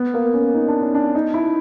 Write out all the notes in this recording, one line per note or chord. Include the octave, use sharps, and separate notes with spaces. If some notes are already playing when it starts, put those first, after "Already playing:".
Already playing: B3
A#3
C#4
D#4
D4
C#4
D4
D#4
E4